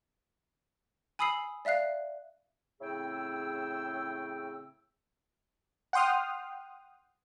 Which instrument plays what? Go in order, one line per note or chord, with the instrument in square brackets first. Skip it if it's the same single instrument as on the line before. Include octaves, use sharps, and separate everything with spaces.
[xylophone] G#5 B5 D#6 E6 C7 F#7
D5 E5 F5 F#6 C7
[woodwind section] A2 C#3 C4 G#4 G5 E6
[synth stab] F#5 G5 C6 D#6 F6